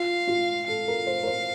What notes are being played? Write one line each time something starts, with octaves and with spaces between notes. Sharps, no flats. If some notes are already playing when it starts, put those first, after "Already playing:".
Already playing: F4 F5
F4
A4 F5
A#4
C5
A#4
C5